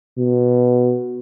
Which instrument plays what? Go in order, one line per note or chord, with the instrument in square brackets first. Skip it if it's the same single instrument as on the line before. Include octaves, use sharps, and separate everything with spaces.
[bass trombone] B2